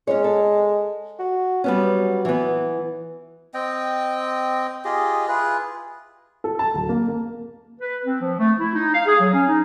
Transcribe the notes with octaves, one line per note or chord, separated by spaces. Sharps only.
G#3 C#4 C#5
A4
F#4
F#3 G3 B3 C#4
E3 B3
C4 D#5 G5
F4 G4 G#4 D#5
E4 F4 G#4 B4
A4
A5
D1
A#3
A#3
B4
C4
F3
A3
E4
D#4
F5
G#4
F#3
C#4
D#4